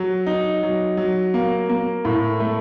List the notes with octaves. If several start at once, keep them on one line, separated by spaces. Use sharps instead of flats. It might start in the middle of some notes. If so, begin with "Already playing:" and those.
Already playing: F#3
D#4
F#3
F#3
A#3
A#3
A2
A3